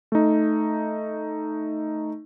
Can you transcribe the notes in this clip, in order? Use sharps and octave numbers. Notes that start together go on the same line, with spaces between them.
A3 D#4